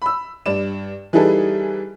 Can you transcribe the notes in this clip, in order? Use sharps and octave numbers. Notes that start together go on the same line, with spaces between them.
B5 E6
G2 D5 E7
E3 G3 D#4 G#4 A4 B4